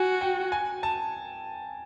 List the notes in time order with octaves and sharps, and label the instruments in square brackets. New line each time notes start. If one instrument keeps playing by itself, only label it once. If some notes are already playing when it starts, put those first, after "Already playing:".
Already playing: [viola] F#4 [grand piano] G#5
[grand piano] G5
G#5
A5